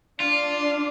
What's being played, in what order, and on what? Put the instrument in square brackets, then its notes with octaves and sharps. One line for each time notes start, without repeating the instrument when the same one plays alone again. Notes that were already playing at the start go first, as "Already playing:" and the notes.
[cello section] D4 [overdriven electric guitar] F4